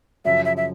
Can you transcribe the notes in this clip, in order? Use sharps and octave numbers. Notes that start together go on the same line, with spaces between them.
F#2 C#3 F3 E5
E5
E5